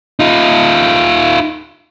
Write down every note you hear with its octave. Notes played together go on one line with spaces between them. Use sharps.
D#4 F4